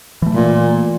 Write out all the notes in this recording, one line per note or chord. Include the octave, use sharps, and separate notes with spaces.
E3 A3
A#2